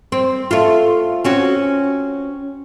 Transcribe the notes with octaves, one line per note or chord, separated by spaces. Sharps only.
C4
A3 F4
C4 C#4 F#4